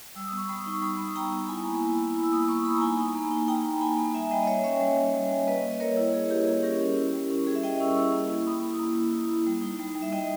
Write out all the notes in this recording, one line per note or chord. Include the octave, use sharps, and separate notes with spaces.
G3 E6
D#6
B3
C#6
G3 B5 D#6
D#4
C#6
G3 B5 D#6
B3
G3 G5 A#5
B3
E4 G#5 B5
A#3
E4
E4
E4
E6
A#3 B5 D#6
D#6
A#3 C#6 E6
A#3 B5 D#6
A#5
D#4 G#5 B5
D#4
A#3
D#4
D#4 G5 A#5
A#3
D#4 G#5 B5
A#3
G3 E5 G#5
G3 D#5 G5
D#5
G3 C#5 E5
C#4 C#5 E5
G3
G3
G3
G3
A#3 B4 D#5
A#3
D#5
A#3 A#4 C#5
E4
A#3 G#4
E4 G4
A#3 G#4
C#4 G4 A#4
C#4
E4
G3
C#4
G3 G#4
E5
G3 D#5 G5
C#4 C#6 E6
E4 C#6 E6
A#3
E4
A#3 B5 D#6
E4
A#3
E4
E4
E4
G3
D#4
G3
G3
E5
G3 D#5 G5